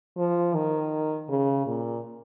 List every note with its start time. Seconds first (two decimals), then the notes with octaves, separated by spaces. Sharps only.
0.17 F3
0.54 D#3
1.29 C#3
1.67 A#2